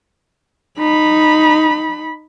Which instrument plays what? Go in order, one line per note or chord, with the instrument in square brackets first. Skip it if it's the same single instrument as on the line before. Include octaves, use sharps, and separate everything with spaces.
[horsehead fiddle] D#4 B5